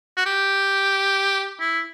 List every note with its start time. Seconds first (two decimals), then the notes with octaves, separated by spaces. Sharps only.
0.17 F#4
0.26 G4
1.60 E4